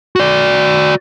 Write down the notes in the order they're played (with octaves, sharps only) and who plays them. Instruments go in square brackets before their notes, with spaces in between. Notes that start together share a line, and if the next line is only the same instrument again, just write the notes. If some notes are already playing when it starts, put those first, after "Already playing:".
[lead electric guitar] F#4 D5